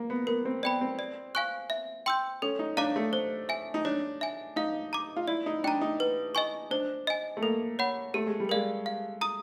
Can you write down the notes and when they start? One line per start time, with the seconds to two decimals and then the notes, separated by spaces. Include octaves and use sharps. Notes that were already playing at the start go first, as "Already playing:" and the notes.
Already playing: A#3
0.10 B3
0.27 B3 A#4
0.45 C4
0.63 B3 D5 G5 B5
0.81 C4
0.99 D5
1.35 F5 G#5 C#6 F#6
1.70 E5
2.06 G5 C6 E6 G6
2.42 C#4 A4
2.59 D#4
2.77 D4 C#5 F5 A#5 D6
2.96 A3
3.13 C5
3.49 E5 G#5
3.74 D#4
3.85 D4 C#5
4.21 E5 G#5
4.56 D#4 F5
4.93 A#5 D6
5.16 F4
5.28 E4 D5
5.46 D#4
5.64 D4 G5 A#5
5.81 D#4
6.00 B4
6.35 D#5 G#5 C#6
6.71 D4 C5
7.07 D#5 G#5
7.37 A3
7.42 A#3 A4
7.79 C#5 F#5 B5
8.14 A3 G4
8.27 G#3
8.40 G3
8.49 G#3 A#4 D5 F5
8.86 F5
9.21 A#5 D#6